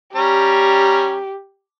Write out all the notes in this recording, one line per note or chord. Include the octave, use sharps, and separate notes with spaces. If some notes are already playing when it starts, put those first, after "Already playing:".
G3 C#4 G4 A#5